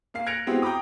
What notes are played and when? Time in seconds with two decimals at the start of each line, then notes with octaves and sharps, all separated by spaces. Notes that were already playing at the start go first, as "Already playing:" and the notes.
0.14 A#3 F5 C7
0.26 F#6 G#6 A#6 C#7 D7 F7
0.47 G#3 B3 C4 E4 F#4 G4
0.62 G5 A#5 B5 D6 D#6